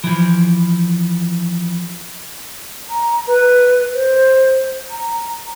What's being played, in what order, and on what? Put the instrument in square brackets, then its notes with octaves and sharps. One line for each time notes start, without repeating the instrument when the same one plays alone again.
[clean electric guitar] E3 F3
[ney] A#5
B4
C5
A#5